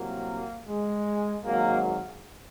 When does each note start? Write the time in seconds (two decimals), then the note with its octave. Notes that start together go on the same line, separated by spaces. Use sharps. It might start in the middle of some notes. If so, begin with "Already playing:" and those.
Already playing: C2 C3 F#3 A#3
0.67 G#3
1.44 G#1 G#2 F#3 A#3